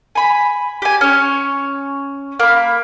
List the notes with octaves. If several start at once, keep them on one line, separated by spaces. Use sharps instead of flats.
G#5 B5
G4 G#5
C#4 C#5
A#3 B5